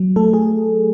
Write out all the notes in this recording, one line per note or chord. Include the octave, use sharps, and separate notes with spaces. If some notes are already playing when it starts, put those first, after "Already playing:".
Already playing: F#3
A3 A4
G#4